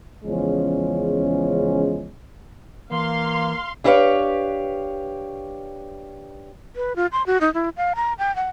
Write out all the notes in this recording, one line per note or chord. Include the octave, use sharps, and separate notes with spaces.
E2 C#3 F3 G#3 C#4
E3 A#3 F5 C6
D4 E4 G4 B4 C#5 F5
B4
F4
C6
F#4
D#4
E4
F5
A#5
G5
F#5